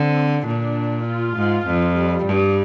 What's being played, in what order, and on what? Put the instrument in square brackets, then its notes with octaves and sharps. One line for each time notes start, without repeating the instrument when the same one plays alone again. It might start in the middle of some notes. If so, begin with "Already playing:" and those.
Already playing: [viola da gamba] D3 [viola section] C4
[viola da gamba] A#2 [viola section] D4
[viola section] F4
[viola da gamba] G#2
F2
[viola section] G3
[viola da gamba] G2